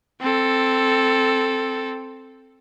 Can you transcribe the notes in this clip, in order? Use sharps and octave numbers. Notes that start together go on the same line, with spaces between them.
C4 A4